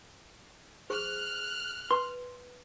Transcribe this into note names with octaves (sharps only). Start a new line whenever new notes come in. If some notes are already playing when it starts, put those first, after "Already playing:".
G#4 C5 C#6 F6 F#6
B4 C6